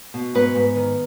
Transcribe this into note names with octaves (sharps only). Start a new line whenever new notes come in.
B2
G#2 B3 B4
G#2
D#3